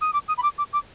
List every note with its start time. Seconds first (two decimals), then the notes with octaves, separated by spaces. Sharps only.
0.01 D#6
0.13 D6
0.28 D#6
0.37 B5
0.43 D6
0.58 D6
0.73 D6